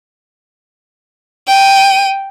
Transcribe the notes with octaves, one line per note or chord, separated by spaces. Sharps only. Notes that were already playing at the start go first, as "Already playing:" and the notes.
G5 D#7